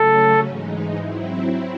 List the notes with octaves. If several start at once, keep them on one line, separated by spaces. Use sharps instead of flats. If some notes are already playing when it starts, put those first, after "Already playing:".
Already playing: C#3 F#3 A3 C#4 A4
G#2 E3 G#3 D#4
F#3 C4 E4